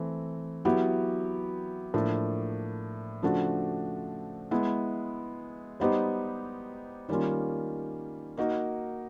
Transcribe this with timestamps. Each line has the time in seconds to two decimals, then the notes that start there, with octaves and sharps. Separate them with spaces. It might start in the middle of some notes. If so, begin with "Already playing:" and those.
Already playing: E3 A3 C4
0.65 F#3 B3 E4 G4
1.94 A2 F3 A#3 D4
3.22 C#3 F3 A3 D4 F#4
4.51 G#3 B3 E4
5.80 G3 B3 D#4 G4 C5
7.09 D#3 G3 A#3 C#4 F4
8.37 A#3 D#4 F#4 A#4